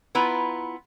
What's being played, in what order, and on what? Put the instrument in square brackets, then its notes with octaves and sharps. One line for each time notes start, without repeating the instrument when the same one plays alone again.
[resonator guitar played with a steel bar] B3 E4 F4 B4 A#5